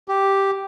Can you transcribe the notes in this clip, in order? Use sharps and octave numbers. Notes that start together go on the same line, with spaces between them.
G4